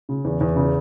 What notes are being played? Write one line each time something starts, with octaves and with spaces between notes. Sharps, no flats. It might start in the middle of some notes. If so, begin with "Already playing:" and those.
C#3
E2
E2
C#3